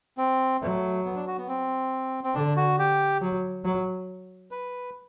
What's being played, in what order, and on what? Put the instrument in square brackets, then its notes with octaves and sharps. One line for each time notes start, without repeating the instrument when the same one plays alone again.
[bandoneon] C4
[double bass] F#3 [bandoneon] A3
[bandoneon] B3
D4
F#4
B3
C4
C4
[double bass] D3 [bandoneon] D4
[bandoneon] F#4
G4
[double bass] F#3
F#3
[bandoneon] B4